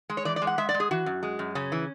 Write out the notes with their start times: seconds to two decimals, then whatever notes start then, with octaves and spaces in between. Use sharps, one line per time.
0.10 G#3
0.17 C#5
0.25 E3 D5
0.36 D5
0.42 G#3
0.47 F#5
0.58 G#3 E5
0.69 D5
0.74 G#3
0.80 G#4
0.91 E3 F#4
1.06 F#2
1.23 G#3
1.39 F#2
1.55 C#3 C#4
1.72 E3